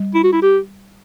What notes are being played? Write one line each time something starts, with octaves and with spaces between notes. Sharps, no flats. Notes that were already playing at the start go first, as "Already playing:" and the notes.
Already playing: G3
E4
F#4
E4
G4